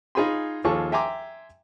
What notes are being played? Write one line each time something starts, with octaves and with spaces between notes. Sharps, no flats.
D#4 F4 G#4 G#5 B5 C6
D#2 F3 F4 G#4 A4 C#6
E5 G5 G#5 A#5 C6 D6